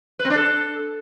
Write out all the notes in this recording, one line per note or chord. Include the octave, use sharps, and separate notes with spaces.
B4
C4
D4
A4